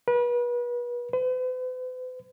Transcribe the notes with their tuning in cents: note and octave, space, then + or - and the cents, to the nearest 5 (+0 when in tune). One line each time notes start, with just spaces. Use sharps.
B4 -35
B4 +45